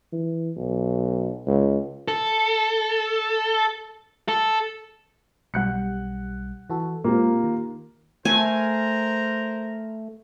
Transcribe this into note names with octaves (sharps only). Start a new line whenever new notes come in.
E3
B1
C#2
A4
A4
B1 G3 F#5 F#6 C#7
E3 F#4 A4
A#2 G#3 A#3 C4 F4 G4
D#3
A3 A#4 C5 G#5 A#5